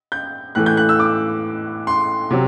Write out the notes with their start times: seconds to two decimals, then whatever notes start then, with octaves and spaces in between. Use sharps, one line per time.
0.12 G6
0.55 A2 E3 A3 F#6
0.66 G6
0.77 F#6
0.89 E6
1.00 D6
1.87 C6
2.31 C3 F#3